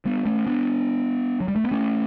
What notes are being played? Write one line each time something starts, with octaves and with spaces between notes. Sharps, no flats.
G3 B3
A3 C#4
B3 D4
F#3
G3
A3
B3
A3 C#4